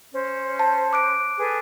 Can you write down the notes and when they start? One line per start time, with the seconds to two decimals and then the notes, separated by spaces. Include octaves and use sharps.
0.13 C#4 C5
0.59 A5
0.93 D6 F#6 D7
1.38 G#4 A4 B4